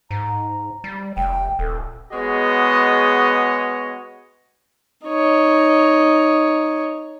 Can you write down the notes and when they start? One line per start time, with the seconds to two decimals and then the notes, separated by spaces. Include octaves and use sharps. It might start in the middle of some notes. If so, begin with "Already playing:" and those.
0.11 G#2 A#5
0.84 G3
1.17 F1 G5
1.59 D#1 A4
2.12 G#3 B3 F#4 G#4 C#5 D#5
5.06 D#4 C#5